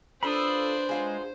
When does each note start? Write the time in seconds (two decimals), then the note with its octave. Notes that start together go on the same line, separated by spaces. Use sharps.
0.23 D4 F4 A4 B4 C5 B5 C6 D#6
0.89 F#3 G#3 F4 G#4